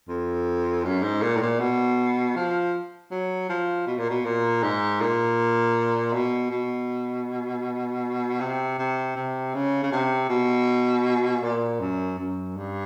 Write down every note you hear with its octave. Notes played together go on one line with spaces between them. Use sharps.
F2
F#2
G#2
A#2
A2
A#2
B2
F3
F#3
F3
B2
A#2
B2
A#2
G#2
A#2
B2
B2
C3
C3
C3
C#3
C#3
C3
B2
A#2
F#2
F#2
G2